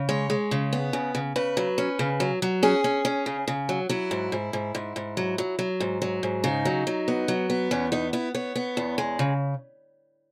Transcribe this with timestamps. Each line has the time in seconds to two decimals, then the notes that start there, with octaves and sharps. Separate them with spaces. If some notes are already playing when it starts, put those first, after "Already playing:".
Already playing: C#3
0.09 G#3 C#5
0.30 G#3
0.51 C#3
0.73 B3
0.93 C#3
1.15 C#3
1.36 C#3 B4
1.57 F#3
1.78 C#4
1.99 C#3
2.20 F#3
2.42 F#3
2.63 C#4 G#4
2.84 C#4
3.05 C#4
3.26 C#3
3.48 C#3
3.69 F#3
3.89 F#3 E4
4.11 G#2
4.32 G#2
4.53 G#2
4.75 G#2
4.96 G#2
5.17 F#3
5.38 F#3
5.59 F#3
5.80 G#2
6.02 F#3
6.23 G#2
6.44 C#3 D#4
6.65 F#3
6.87 F#3
7.08 B3
7.28 F#3
7.50 B3
7.71 E2 C#4
7.92 B3 D#4
8.13 B3 E4
8.34 B3 C#5
8.56 B3
8.77 E2
8.98 G#3
9.19 C#3